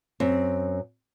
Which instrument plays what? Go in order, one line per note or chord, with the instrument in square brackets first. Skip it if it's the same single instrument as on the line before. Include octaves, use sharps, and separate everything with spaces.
[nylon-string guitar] F#2 C4